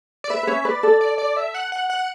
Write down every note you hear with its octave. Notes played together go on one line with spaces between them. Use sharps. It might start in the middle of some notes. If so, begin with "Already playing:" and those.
D5
B4 E5
B4
C#4 C#5
B4 D5
A4
D5
D5
E5
F#5
F#5
F#5